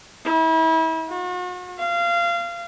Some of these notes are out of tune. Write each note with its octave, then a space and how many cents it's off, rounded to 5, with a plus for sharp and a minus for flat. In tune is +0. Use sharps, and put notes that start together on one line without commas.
E4 -35
F#4 -40
F5 -25